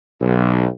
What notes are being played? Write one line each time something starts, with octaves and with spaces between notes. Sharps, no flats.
B1